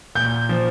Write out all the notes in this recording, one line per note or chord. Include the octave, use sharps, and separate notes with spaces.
A#2 G6
F3